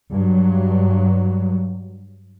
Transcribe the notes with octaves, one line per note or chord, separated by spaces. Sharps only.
G2 F#3